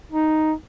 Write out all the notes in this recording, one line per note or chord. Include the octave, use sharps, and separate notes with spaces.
D#4